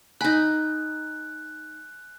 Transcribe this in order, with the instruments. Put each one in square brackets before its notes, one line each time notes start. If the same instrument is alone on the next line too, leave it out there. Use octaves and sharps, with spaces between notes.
[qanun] D#4 B5 [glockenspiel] G#5 F#6